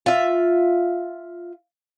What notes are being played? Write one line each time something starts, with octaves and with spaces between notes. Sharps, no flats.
F4 E5